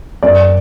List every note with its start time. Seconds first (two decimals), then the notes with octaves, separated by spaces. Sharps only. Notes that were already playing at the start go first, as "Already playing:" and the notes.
0.23 F#2 D5